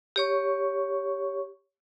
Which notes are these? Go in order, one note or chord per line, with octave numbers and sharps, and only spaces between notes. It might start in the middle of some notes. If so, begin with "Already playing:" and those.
G4 C#5 C#6